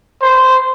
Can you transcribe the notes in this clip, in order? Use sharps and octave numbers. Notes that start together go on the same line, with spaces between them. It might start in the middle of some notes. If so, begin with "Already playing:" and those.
C5